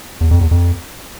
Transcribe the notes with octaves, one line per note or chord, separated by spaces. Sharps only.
E2
F2
E2
F2